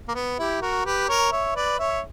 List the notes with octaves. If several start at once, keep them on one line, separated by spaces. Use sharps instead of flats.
A#3
B3
E4 G4
F#4 A#4
G4 B4
A#4 C#5
C#5 E5
B4 D5
C#5 E5